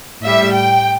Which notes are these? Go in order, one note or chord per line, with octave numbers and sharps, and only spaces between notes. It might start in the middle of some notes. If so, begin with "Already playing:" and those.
A2 G3 E5
G5